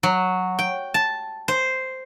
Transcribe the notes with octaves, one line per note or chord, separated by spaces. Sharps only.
F#3
G5
A5
C5